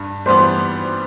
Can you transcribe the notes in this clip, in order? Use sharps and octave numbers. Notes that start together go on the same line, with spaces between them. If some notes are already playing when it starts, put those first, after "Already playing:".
Already playing: G2
E3 G3 B3 C5